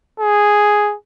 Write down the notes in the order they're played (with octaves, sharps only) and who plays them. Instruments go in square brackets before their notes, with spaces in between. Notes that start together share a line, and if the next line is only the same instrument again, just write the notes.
[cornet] G#4